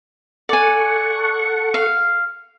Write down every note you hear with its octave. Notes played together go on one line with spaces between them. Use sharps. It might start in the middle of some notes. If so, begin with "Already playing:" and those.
A4 D5 F#5 G#5 C#6
F5